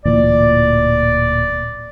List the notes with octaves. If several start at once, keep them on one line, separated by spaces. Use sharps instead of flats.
D1 A#2 E3 D5